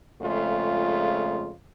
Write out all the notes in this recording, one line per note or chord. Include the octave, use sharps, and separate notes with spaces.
F2 C#3 G#3 A3 F4